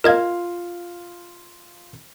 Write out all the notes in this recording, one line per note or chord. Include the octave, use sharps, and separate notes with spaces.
F4 A#4 D#5 F5 G#6